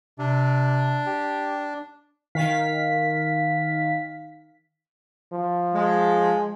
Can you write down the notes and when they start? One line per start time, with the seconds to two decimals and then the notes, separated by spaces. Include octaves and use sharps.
0.19 C3 D4
1.07 G4
2.35 D#3 F5 B6
5.33 F3
5.74 G#3